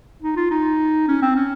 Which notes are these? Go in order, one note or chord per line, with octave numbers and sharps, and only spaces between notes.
D#4
F4
D#4
C#4
C4
C#4